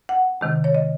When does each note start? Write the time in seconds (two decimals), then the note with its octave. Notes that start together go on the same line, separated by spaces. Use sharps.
0.09 F#5
0.41 C3 D#3 G#3
0.64 C#5
0.75 D#5